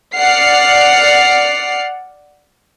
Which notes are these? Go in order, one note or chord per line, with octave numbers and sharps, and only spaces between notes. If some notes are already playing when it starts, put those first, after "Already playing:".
D5 F#5 F6 C7